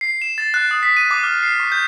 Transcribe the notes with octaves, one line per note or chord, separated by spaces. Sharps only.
C7
E7
A6
F#6
D#6
B6
D#7
D6
F6
C7
C#6
G6